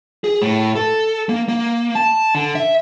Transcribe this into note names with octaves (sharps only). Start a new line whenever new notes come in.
G#4
A2
A4
A#3
A#3
A5
D3
E5